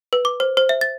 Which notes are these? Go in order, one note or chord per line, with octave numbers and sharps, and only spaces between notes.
B4
D6
C5
C5
E5
A6